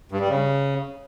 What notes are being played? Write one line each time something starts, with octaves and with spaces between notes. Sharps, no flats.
G2
G3
C#3